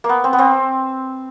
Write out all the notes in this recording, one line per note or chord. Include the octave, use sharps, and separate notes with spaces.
A#3
B3
C4
B3
C4